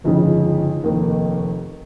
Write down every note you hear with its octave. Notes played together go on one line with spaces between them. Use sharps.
G1 F2 C#3 G#3 D#4
F1 D#2 D#3